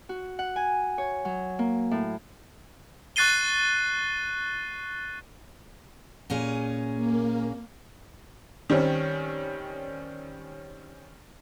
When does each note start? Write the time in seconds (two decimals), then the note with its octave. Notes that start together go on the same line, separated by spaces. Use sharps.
0.09 F#4
0.39 F#5
0.56 G#5
0.98 C#5
1.25 F#3
1.59 A#3
1.91 A2
3.16 C#6 F#6 A6 C7 D#7 G7
6.30 A#2 C#4 G#4
6.96 A#3
8.70 D#3 G3 C4 C#4